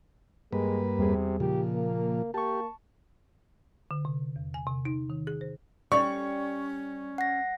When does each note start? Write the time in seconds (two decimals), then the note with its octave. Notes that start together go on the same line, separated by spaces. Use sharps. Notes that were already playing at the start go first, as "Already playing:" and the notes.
0.53 G2 G#3 A#3 B4
0.98 E2 C3 G3 G#4
1.40 A#2 C#3 F3 G4
1.75 A#3
2.34 A#3 G4 A5 C#6
3.91 D3
4.05 C3
4.36 E2
4.54 G#5
4.67 C3
4.85 D#4
5.10 D#3
5.27 G#4
5.41 C5
5.92 G3 C#4 C#6
7.18 F#5 A#6